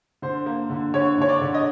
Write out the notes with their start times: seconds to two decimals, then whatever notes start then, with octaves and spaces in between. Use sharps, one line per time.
0.22 D3 C5
0.46 A#3
0.70 D3
0.94 D3 C#5
1.18 D3 C#5
1.29 D5
1.42 D3
1.54 D#5